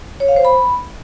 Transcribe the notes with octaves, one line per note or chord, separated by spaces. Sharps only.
C#5
F5
C5
B5